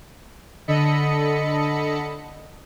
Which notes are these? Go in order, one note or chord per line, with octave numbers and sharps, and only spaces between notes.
D3 A4 D#5 B5 C#7